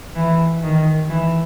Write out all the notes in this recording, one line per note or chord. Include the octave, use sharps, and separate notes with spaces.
E3
D#3
E3